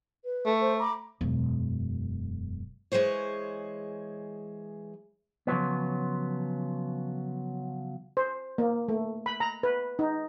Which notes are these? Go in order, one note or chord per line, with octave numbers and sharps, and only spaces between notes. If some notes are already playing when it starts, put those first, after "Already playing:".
B4
A3
C5
A#5 B5 D6
E1 F#2
E3 G#3 G#4 C5 C#5
C#3 F3 F#3 B3
C5
A#3
A3
B5
A#5
B4
D#4